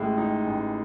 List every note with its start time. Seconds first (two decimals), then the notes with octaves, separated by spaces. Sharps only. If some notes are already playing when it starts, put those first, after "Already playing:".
Already playing: A1 A2 G#3
0.18 D#4
0.47 A1